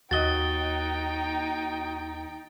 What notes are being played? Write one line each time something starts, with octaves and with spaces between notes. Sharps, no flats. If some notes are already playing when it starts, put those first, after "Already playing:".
D#2 D#4 F#4 D#5 G5 A6 G7